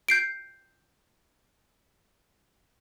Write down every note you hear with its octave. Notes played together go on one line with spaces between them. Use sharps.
G6 C7 D7